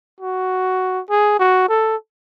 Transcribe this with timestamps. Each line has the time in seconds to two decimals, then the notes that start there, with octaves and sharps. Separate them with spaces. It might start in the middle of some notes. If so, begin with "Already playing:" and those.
0.20 F#4
1.10 G#4
1.40 F#4
1.69 A4